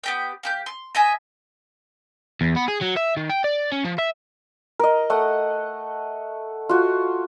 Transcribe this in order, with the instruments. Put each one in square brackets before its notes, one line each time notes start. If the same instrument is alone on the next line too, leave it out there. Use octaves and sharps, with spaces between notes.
[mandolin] B3 G4 G5
A#3 G4 G6
C6
D#5 E5 G#5
[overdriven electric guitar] E2
B3
G#4
F#3
E5
D#3
G5
D5
C#4
F3
E5
[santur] A#4 D#5
A3 F#5 D#6
F4 F#4